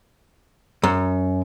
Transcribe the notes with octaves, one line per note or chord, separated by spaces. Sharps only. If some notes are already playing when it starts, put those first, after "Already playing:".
F#2